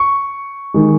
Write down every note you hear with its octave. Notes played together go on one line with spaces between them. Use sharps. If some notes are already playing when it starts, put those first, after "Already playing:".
Already playing: C#6
D#3 G#3